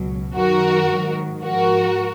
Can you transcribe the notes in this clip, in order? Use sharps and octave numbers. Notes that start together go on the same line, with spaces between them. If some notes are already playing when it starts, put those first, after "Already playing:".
Already playing: C#2 B2 F#3
F#2 D#3 F#3 F#4 A#4
G#2 D#3 F#3
G#2 F3 F#4 A#4